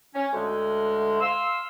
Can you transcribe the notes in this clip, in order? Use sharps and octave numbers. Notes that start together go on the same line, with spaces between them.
C#4
D2 G#3
F5 C6 E6